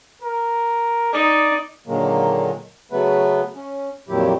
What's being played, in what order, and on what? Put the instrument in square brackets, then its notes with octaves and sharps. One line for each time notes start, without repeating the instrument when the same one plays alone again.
[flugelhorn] A#4
[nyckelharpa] D#4 [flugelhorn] D5
[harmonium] A#2 D3 D#3 F#3 G#3 A#3
C#3 F#3 A3 B3 B4
C#4
F2 A#2 D#3 F#3 E4 G4